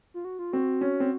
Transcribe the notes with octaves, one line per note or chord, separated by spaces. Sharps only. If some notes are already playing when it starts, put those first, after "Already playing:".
F4
F#4
F4
C4 F#4
C#4
C4